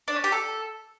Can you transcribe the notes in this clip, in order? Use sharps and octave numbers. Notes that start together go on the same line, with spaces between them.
D4
C#4
G4
A4